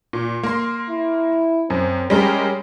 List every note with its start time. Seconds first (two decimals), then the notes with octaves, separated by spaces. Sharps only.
0.13 A#2
0.43 A#3 C6
0.90 E4
1.70 F#2 C4
2.10 G3 G#3 C#4 A#4